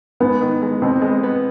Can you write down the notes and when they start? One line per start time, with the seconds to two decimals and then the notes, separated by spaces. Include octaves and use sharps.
0.20 G#2 B3
0.41 D#3
0.62 G#3
0.82 B2 C4
1.02 G#3
1.23 B3